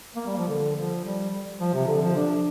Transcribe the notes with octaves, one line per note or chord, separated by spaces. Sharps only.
A#3
G3
F3
D3
F3
G3
F3
C3
D3
F3
D4